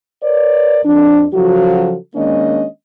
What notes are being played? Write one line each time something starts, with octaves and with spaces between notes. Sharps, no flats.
A#4 B4 C#5 D5
F2 D4
C#3 F3 F#3 F4 F#4 A4
D#3 G#3 A#3 C#4 D4 D#5